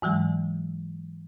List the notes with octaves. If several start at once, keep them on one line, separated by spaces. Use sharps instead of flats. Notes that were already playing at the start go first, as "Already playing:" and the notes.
G#2 E3 F#3 G#3